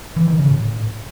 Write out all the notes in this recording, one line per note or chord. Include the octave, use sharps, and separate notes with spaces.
E3
D#3
C#3
A2